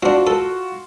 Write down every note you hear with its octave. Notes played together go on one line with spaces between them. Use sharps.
C4 D4 F4 F#4
A4